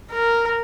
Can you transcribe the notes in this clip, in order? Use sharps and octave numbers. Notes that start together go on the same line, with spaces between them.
A#4